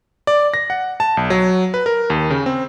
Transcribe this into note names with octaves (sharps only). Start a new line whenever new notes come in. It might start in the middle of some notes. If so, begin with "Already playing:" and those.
D5
A#6
F#5
A5
B1
F#3
B4
A#4
D#2
C#3
C4